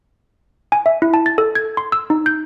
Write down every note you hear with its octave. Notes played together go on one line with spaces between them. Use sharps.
G#5
E5
E4
A5
A6
A4
G#6
C6
E6
D#4
G6